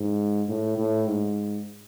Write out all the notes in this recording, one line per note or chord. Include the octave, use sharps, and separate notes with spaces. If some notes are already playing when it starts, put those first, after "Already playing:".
Already playing: G#2
A2
A2
G#2